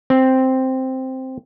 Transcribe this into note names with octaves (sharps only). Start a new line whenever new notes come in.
C4